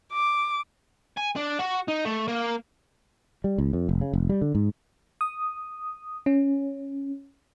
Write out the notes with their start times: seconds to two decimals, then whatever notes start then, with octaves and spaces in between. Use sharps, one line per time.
0.13 D6
1.17 G#5
1.36 D4
1.59 F#4
1.88 D#4
2.05 A3
2.28 A#3
3.44 G3
3.58 C#2
3.73 F2
3.89 F1
4.01 C#3
4.13 F1
4.29 G3
4.42 D3
4.55 G#2
5.21 D#6
6.26 C#4